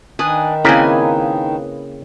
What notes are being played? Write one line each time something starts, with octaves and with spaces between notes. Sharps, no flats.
D#3 D4 B4 G#5 D#6
C#3 A#3 C4 E4 A#4 B4 D#5 G#5